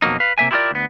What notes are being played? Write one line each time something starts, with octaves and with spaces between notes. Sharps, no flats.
F2 B2 F#3 A#3 D#4
B4 F5
C3 A#3 E5 G#5
E4 F4 G4 G#4 A#4 D5
D2 B3